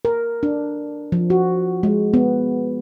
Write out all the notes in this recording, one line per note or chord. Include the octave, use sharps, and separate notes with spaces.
A#4
D4
F3
F#4
G#3
B3